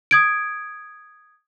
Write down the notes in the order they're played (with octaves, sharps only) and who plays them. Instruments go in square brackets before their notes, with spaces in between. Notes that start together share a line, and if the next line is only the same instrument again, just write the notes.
[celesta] D#6 G#6 D7